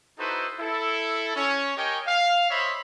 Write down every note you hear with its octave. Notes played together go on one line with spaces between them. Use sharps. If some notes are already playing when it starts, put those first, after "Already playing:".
D#4 E4 F#4 A4 B4 C5
E4 A4
C#4 C#5
G4 A#4 C#5 D#5 G5 G#5
F5
C5 C#5 D#5 E5 B5 C6